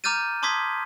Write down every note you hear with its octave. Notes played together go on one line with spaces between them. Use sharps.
A#5 D6 F6 G6 A6 D#7
A5 C6 D6 D#6 G#6 B6